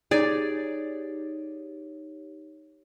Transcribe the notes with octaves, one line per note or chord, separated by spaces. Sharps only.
D#4 G4 G#4 C#5 D5